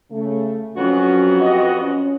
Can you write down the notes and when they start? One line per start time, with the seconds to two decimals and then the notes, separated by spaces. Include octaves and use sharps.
0.10 C#3 A3
0.77 F2 F#3 B3 C#4 F#4
1.41 G4 D#5
1.80 C#4